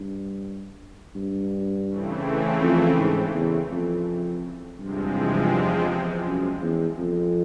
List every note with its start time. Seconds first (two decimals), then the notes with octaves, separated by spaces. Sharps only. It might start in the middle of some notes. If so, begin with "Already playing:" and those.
Already playing: G2
1.16 G2
1.88 C#3 E3 A3 C4
2.61 F2
2.98 G#2
3.34 E2
3.71 F2
4.80 E2 G2 C3 F3 G#3 C4
6.25 F#2
6.62 E2
6.98 F2